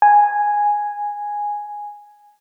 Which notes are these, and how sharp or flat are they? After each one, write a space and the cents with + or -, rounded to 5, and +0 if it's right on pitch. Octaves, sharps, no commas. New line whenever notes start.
G#5 -5